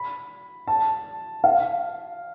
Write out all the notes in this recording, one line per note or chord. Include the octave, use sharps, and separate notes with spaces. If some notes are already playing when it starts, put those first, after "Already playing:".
Already playing: B5
A5
F5